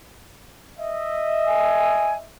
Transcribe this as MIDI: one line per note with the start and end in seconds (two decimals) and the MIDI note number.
0.79 2.27 75
0.79 2.27 76
1.46 2.13 80